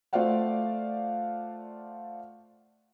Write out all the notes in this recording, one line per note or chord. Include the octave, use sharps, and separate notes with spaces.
A3 F4 C5 D5 F5 F#5